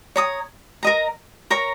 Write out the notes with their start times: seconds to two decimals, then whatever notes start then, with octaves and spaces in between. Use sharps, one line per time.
0.16 C#5 A#5 D#6
0.83 A#4 D#5 A#5
1.50 A#4 C#5 A#5